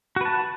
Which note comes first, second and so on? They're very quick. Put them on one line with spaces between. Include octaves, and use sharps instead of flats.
F#4 B4 A5